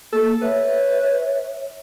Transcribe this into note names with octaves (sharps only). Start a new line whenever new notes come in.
A#3 A4
B4 C#5 E5